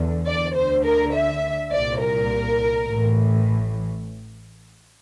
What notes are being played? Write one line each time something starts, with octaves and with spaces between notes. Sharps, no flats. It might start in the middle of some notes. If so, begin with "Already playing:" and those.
Already playing: E2 D3
D5
D2 D3 C5
A#4
E5
C2 A#2 D5
A#4
A1 A2 E3